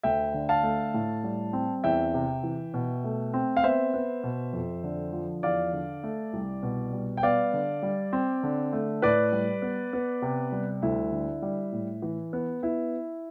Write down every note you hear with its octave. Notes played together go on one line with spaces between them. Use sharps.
D2 E5 G5
D3
F5 A5
A3
A2
G3
C4
E2 E5 G5
C3
E3
B2
A3
C4
F5
B3 C5 E5
B3
B2
F2
D3
F3
E2 D5 F5
D3
A3
C2
B2
G3
G5
B3 D5 F5
D3
G3
C4
D3
A3
A2 B4 D5
G3
B3
B3
C3
G3
D2 E4
D3
G3
A2
E3
B3
B3 E4